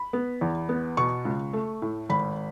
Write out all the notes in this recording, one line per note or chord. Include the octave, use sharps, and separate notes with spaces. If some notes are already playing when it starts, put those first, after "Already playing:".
Already playing: B5
B3
E2
B3
B2 C#6
C#2
A3
A2
G#1 B5